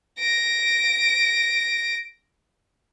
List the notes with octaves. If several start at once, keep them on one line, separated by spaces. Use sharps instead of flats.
A#6 D7